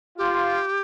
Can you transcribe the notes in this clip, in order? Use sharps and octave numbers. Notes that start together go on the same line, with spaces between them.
F4 G4